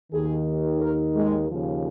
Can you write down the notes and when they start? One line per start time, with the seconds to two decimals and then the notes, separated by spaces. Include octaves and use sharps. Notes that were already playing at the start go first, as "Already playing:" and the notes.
0.13 D#2 D#3 G#4
0.81 A#4
1.15 G#3
1.49 D#2 C#3 F3